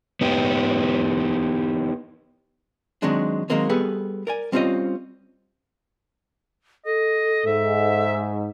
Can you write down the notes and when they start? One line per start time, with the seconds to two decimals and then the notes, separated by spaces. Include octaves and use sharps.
0.21 B3 D#4 G4
3.02 D#3 F#3 G#3 C4 D4
3.50 D#3 F#3 G#3 A#3 C4
3.69 G3 B3 G#4 A4 B4
4.27 A#4 D5 G#5
4.52 G3 C4 C#4 F4 C5 D#5
6.86 A4 D#5
7.46 G#2 E5